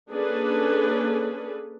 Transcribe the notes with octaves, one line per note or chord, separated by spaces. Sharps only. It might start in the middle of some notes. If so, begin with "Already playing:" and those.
A#3 C#4 D4 G#4 A4 B4